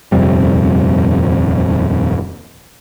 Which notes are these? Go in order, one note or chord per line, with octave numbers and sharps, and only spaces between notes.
D#1 F2 C3 G3